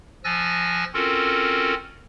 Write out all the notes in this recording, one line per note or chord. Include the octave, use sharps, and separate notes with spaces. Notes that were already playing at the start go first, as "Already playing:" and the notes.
F3 G#5 E6 F#6 A6 A#6
C4 C#4 F4 F#4 A4 A#4